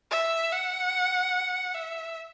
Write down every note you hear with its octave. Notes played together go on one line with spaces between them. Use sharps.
E5
F#5
E5